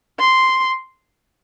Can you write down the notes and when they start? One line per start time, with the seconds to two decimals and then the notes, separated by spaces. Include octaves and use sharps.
0.19 C6